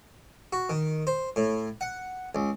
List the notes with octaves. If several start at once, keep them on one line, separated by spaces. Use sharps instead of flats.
F#4
D#3
C5
A2
F#5
C#2